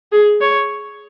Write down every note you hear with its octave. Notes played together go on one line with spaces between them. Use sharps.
G#4
C#5